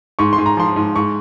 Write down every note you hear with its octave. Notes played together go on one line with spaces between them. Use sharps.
G#2 C#6
C6
G#2
A#5
F3 C6
G#2
G#2 C#6